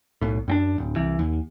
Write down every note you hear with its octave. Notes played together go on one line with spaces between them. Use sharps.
B1 A2
F#2 C4 D4
D1
C2 E3
D#2